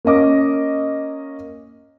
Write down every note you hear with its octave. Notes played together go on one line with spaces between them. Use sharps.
A#3 C#4 D#5 D6